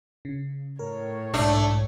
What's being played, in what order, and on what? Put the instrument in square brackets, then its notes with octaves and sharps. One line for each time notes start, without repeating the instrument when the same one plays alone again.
[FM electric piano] C#3
[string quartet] A2 C#5 [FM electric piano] A#4
[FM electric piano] B1 G#2 [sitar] A3 D4